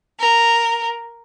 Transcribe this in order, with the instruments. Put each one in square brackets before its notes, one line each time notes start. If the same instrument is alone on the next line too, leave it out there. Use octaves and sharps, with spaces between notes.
[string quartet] A#4